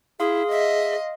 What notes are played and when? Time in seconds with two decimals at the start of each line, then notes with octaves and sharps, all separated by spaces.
0.20 E4 G#4 F5 C6 D#6
0.51 D#5 E5